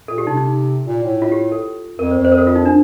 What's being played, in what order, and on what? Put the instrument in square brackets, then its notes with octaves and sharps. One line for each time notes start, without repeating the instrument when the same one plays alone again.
[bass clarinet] A#2 [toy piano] A4
[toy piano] G4
[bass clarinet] C3 [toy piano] D#4
[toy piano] D#4
[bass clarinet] A#2
A2
[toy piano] F4
G4
A4
[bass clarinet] F2 [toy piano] A#4
[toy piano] C5
[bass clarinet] F2
[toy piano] C5
A#4
A4
F4
D#4
D4